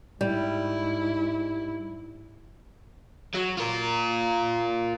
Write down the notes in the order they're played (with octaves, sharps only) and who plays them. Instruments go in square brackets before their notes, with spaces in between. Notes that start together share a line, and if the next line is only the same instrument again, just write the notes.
[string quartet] G#2 E4 [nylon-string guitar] G3
[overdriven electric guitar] F#3
F4 A#4